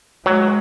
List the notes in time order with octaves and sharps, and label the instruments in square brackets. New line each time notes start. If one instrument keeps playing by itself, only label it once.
[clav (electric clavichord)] F#3 [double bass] G#3